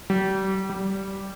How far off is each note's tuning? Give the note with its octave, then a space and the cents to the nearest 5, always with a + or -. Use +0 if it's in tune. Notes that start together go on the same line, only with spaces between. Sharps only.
G3 -35
G3 -15